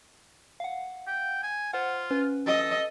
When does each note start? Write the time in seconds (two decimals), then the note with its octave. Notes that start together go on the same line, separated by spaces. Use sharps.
0.60 F5 F#5
1.07 G5
1.43 G#5
1.73 F4 C5 F#5
2.11 C#4 B4
2.47 A4 D#5